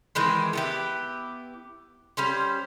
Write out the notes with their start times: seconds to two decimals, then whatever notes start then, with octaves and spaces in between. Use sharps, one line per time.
0.15 D#3 E3 G#3 C4
0.53 B3 E4 G4
2.17 G3 C#4 C5